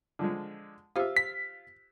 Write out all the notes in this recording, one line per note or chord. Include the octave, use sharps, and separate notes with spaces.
D3 F3 G#3
F4 G4 C5 E5 F5
B6